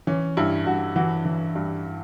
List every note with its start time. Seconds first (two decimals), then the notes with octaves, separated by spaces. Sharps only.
0.07 E3 C#4
0.37 G2 E4
0.66 G2 F#4
0.96 E3 F#4
1.25 E3
1.55 G2